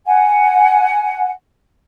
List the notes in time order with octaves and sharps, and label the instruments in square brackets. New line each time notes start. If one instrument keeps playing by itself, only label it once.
[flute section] F#5 G#5